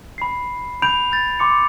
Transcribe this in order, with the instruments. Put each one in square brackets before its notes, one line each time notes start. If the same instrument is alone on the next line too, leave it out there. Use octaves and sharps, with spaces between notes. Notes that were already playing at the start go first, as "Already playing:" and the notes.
[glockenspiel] B5 C7
B5 G6 D7 F7
G6 A6
C6 D6 C#7